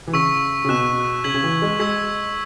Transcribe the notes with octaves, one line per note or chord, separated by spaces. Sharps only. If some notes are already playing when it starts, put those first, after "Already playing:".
E3
C#3 C#6 E6 B6
C#3
B2 F#6 E7
C#3 G#6 B6 F#7
C#3
E3
G#3
G#3 E6 G#6 B6